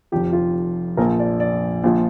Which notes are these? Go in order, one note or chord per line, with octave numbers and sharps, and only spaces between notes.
F1 F2 F3 G4
F4
A#1 A#2 F3 A#4
D5
D5
A#1 A#2 F3